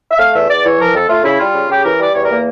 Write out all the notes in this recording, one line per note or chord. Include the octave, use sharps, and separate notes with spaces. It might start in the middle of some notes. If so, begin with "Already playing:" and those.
E5
A3 F5
E2 E5
E2 D5
E3 C#5
F3 A#4
F2 A4
A3 F4
C#3 E4
G3 F4
C#3
C#3 G4
E3 A#4
G3 D5
E2 C#5
A#4
A#3